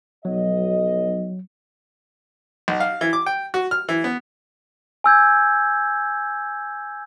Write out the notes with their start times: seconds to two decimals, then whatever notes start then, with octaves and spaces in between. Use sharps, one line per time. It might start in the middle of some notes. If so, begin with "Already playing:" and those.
0.25 B1 F#3 D#5
2.68 B1
2.80 F5
3.01 E3
3.13 D6
3.26 G5
3.54 F#4
3.71 F6
3.89 E3
4.04 B3
5.04 G#5 E6 G6 G#6